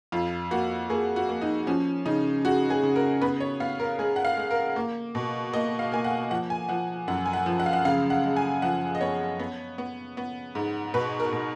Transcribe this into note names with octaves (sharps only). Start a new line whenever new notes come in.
F2 F4
A#3 F#4
A#3 G#4
F#4
A#3
D#4
F3 C#4
C#3 D#4
G#3 F#4
G#4
C#3
A#4
B3 B4
C#5
B3 F5
A#4
G#3 G#4
F#5
F5
G#3
A#4
A#3
B2
A#3 D#5
F5
A#3 G#5
F#5
F3 F#5
G#5
F3 F#5
F#2 F#5
G#5
F#5
F3
F#5
F5
F#5
C#3 F5
F#5
G#3
G#5
F3 F#5
D#5
B3 C#5
B3
B3
B3
G#2
B2 B4
A#4
B2